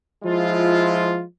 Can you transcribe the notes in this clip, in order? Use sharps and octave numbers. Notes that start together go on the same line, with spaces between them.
F3 G#3 E4 F4